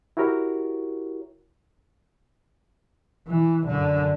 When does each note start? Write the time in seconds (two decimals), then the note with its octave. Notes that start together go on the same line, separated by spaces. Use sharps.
0.17 E4 F#4 G4 A#4 C#5
3.28 E3
3.67 F#2 D3